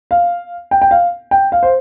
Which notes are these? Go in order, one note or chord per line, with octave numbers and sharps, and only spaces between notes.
F5
G5
G5
F5
G5
F5
C5